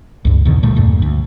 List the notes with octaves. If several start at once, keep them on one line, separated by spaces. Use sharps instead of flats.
C#2 G2
E2 B2 D3 D#3
D2 A#2 G3 A3
E2 G2 A#2 A3
D2